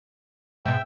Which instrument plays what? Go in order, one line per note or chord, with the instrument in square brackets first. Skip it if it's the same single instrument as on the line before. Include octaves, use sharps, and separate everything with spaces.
[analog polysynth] G#2 B2 [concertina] E5 G5 E6